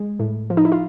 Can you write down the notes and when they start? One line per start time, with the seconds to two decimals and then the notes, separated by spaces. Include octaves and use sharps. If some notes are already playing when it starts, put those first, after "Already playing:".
Already playing: G#3
0.19 A2
0.50 F3
0.57 D#4
0.65 E4
0.72 F4